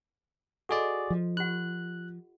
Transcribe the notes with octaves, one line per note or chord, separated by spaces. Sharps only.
F#4 G#4 A4 D5 D#5 C6
F3
F4 G4 F#5 F#6